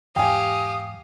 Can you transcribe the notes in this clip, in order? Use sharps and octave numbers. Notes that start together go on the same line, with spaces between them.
E2 G#2 G4 F5 G5 G#5 D#6